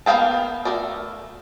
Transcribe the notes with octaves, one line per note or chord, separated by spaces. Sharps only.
A#3 B3 F5 G5 A5
A3 A#4 D5